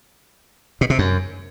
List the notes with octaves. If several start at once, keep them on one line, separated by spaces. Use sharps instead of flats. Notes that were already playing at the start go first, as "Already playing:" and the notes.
B2
C3
F#2